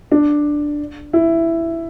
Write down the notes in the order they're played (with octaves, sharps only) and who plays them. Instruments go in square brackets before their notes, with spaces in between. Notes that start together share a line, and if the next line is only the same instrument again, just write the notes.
[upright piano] D4
E4